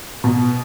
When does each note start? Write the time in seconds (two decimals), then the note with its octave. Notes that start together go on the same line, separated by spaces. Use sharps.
0.24 B2